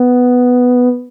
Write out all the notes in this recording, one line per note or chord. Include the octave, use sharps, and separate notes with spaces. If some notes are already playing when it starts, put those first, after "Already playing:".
Already playing: B3